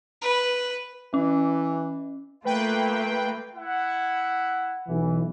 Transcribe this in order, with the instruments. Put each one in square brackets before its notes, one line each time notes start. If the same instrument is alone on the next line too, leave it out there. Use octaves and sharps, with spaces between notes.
[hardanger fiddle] B4
[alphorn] E3 [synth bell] C#4
[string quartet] A3 A#3 F4 [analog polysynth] B4 G5
[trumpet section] E4 F#5
[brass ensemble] B1 E3